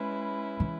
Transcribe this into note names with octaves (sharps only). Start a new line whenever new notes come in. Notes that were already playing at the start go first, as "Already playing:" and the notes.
Already playing: G#3 C#4 E4 B4
E3